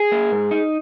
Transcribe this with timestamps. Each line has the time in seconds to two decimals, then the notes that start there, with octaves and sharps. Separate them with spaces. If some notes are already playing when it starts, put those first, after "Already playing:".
Already playing: G#4
0.12 A#3
0.32 G#2
0.51 D#4